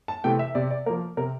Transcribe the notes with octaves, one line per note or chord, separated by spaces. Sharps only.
A5
C3 E3 A3 G5
E5
C3 D5
D5
F3 A#3 A#4
C3 A#4